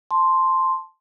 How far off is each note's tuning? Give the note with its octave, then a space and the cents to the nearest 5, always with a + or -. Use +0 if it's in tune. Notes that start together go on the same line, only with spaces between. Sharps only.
A5 -5 C6 +0